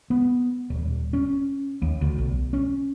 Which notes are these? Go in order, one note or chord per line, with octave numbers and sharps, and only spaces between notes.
B3
D#1
C#4
D#2
D2
B1
C#4